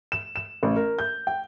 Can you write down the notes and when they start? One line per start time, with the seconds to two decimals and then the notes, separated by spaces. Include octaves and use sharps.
0.12 E7
0.36 E7
0.63 A1
0.76 A#4
0.99 G6
1.27 G5